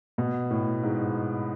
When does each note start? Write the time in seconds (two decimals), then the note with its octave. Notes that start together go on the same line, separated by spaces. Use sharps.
0.18 B2
0.50 A2
0.83 G#2